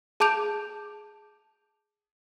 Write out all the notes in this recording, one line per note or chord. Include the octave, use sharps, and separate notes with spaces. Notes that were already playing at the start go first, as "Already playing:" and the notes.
G#4 A5 D6 G6 D7 F7